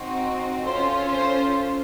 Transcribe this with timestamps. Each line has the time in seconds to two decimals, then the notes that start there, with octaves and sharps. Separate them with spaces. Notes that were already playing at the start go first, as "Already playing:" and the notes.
Already playing: C4 D#4 F#4
0.65 C#4 F4 A4 C5
1.11 C5